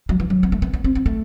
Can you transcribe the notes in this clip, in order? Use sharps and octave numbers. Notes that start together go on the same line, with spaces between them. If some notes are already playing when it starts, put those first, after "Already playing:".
F#3
E3
F#3
B3
A3
B3
B3
C4
C4
A3